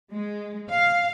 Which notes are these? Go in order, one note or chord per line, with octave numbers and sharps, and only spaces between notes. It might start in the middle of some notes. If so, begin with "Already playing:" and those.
G#3
F5